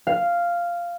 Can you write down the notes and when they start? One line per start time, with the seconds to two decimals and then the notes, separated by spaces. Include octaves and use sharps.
0.07 F5